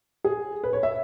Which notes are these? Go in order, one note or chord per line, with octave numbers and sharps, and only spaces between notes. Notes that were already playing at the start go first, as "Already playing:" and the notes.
G#4
B4
C#5
E5